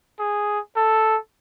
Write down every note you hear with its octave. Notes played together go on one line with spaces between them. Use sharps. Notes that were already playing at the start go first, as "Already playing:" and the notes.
G#4
A4